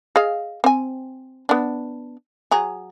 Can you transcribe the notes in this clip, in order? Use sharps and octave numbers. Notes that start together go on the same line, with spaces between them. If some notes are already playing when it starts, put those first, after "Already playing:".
G#4 D#5 F5
C4 G#5
B3 D4
F#3 G#4 A#5